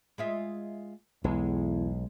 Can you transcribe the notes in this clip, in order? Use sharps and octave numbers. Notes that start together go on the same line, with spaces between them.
G#3 F4 E5
B1 E2 G#3